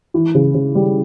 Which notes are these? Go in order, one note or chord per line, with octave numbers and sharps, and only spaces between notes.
E3
C#3
C#3
G3